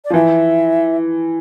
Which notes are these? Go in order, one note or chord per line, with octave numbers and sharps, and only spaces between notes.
D5
F3
E3 E5